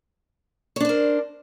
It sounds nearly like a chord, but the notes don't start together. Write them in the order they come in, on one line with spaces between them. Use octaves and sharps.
C#5 D4 C5 A#4